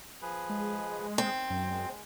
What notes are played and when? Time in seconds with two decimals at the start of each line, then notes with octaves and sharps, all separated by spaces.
0.22 F3 G#4 B4
0.50 G#3
1.18 D#3 C4
1.50 F#2
1.69 G#3